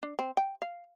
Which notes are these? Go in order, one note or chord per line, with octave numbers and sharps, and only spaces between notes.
D4
C4
G5
F5